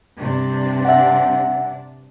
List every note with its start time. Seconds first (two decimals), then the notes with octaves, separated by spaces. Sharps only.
0.19 G2 C3 D4
0.85 E5 F#5